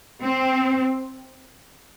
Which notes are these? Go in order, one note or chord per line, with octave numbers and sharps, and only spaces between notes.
C4